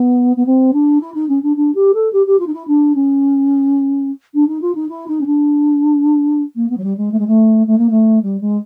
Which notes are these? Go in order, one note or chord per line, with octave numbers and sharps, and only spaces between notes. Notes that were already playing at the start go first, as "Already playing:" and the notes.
Already playing: B3
B3
C4
D4
E4
D#4
C#4
D4
D4
G4
A4
G4
G4
F4
D#4
E4
D4
C#4
D4
D#4
F4
D#4
E4
D#4
C#4
D4
A#3
B3
F#3
G3
G#3
A3
G#3
A3
A3
A#3
A3
G3
G#3